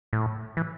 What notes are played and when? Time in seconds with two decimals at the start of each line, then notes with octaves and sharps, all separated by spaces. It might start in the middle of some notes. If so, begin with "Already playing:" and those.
0.13 A2
0.57 E3